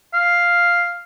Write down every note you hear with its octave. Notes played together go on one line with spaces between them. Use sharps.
F5